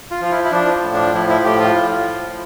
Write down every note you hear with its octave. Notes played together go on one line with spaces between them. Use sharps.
F4
F3 F4
E4
E4
F3 D4
A2
D4
F3 E4
E4
A2 G4
F4
A2
F3